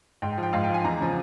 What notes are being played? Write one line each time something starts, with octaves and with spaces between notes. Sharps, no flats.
G#2 G5
G5
F3
G5
G#2 F5
G5
F3
G#5
E2 A#5
C#3 F3